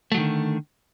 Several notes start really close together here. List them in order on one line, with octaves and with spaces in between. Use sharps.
A3 F#3 D#3 D3